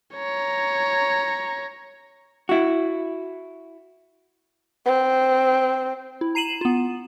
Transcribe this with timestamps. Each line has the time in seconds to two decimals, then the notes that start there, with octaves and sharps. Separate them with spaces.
0.16 C#5 A#5
2.49 E4 F#4
4.86 C4
6.21 E4
6.35 A#5 C7 D#7 E7 F#7
6.61 B3 F4